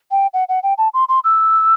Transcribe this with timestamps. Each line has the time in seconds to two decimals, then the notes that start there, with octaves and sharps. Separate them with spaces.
0.11 G5
0.33 F#5
0.49 F#5
0.63 G5
0.78 A5
0.94 C6
1.09 C6
1.24 E6